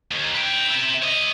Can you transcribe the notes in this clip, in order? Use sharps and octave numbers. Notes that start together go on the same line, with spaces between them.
D#2
B4 G5
C4 E5
C#5 D#5